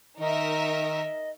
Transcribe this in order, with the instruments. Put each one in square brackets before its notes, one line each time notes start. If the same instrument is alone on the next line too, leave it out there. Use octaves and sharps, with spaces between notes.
[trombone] D#3 [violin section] D#4 A#4 E5 [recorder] D#5